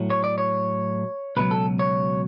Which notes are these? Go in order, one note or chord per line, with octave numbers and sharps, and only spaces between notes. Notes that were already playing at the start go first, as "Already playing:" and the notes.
Already playing: A2 F#3
C#5
D5
C#5
C#2 B2 F#3 B4
A4
C#5